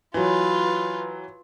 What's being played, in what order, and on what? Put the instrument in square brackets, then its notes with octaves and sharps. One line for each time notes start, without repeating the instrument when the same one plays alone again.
[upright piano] E3 F#3 [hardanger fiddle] F4 B4